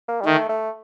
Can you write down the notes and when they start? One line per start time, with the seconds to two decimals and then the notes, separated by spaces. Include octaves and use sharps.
0.09 A#3
0.21 G3
0.26 D#3 A3
0.49 A3